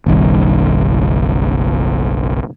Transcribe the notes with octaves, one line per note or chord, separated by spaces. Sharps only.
F#1 B1 D#3 G3